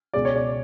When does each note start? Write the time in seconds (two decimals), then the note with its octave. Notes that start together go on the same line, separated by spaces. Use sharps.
0.14 C#2 B2 G#3 D5
0.25 C#5
0.36 D5